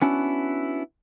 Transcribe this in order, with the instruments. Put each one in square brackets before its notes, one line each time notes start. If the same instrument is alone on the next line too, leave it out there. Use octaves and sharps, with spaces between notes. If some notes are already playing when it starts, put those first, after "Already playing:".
[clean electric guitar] B3 C#4 D4 E4 F#4